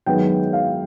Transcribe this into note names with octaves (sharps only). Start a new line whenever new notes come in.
F#2 D#3 G#3 B3 G5
F5